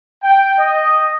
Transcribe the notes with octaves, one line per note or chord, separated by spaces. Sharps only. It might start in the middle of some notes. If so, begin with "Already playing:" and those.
G5
D#5